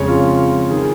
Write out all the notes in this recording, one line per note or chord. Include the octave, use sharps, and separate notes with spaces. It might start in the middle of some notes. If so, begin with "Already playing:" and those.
Already playing: F2 C#3 G#3 C#5
F4
D#3 G#4